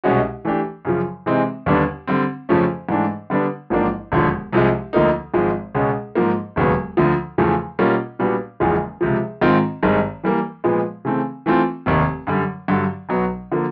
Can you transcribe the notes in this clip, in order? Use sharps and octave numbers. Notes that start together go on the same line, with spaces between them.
C2 B2 G#3 C#4 F#4
E3 A3 D4 G4
F#2 C#3 F3
C3 E3 G#3 C4 D#4
D#2 D3 G3 B3 D4
D3 G3 C4
F2 C#3 F3 A3 C#4
G#2 E3 A3 D4
D3 G3 B3 D4
A1 G#2 F3 A#3 D4
E1 D#2 D3 F3
C2 C3 F3 G#3
D2 D3 F3 A#3 D#4
G#1 G#2 F3 G#3
C#2 B2 G#3 C#4
G#2 F3 A#3
E1 D#2 C#3 F#3 B3
D2 D3 F3
E2 C#3 F3 A3
B2 G3 A#3 C#4 F4
A#2 G3 B3 D4 F#4
F#1 E2 C#3 F3 G#3
C#2 C3 F3
G#2 D#3 G#3 C4 F4
G#1 G2 D#3 G#3
E3 G3 A#3
A#2 F3 G#3 B3
C#3 E3 A3 C4
E3 A3 C4 F4
F1 D#2 D#3
F#2 D3 G3
G2 D3 F#3
B1 B2 F#3 B3
D3 F3 A#3